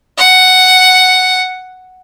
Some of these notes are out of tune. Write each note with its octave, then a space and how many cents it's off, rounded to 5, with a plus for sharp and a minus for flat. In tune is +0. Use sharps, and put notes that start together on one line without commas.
F#5 +5